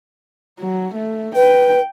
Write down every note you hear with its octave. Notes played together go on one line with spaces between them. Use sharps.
F#3
A3
B4 G5